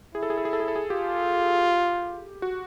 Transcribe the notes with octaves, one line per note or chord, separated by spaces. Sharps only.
E4 G#4
A4
G#4
A4
G#4
A4
G#4
A4
G#4
F4 G4
F#4